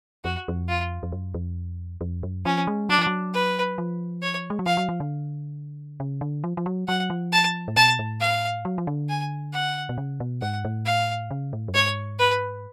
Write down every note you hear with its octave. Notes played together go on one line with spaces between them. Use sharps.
F2 F#4
F2
F4
F2
F#2
F2
F2
F#2
F3 C#4
G#3
F#3 D4
F3
F#3
B4
F3
C#5
G#3
F#3
F3 F5
F#3
F3
D3
C#3
D3
F3
F3
F#3
F#3 F#5
F3
A5
A2
B2 A5
A2
F5
F#3
F3
D3
G#5
F#5
B2
C#3
B2
G#2 F#5
A2
F5
C#3
A2
F#2
G#2 C#5
B4